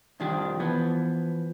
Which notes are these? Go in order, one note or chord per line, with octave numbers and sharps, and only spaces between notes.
C2 F2 D#3 F3 D4 G4
E3 F3 B3